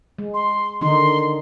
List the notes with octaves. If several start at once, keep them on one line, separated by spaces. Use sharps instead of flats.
G#3
C6
D3 D#3 D#4 C6